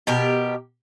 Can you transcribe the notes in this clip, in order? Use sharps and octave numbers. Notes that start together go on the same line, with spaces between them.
B2 G4 A#4